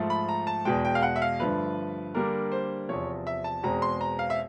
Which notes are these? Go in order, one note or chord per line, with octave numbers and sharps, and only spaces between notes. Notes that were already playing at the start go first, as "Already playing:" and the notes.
Already playing: G#2 F3 A3
B5
A#5
A5
E2 B2 G#3 G5
G5
F5
F#5
E5
F5
G2 D3 F3 A3 B4
D3 G3 A#3 D4 A#4
C5
E2 C3 F3 C#5
E5
A5
E2 B2 G#3 C4 A#5
C6
A#5
F5
E5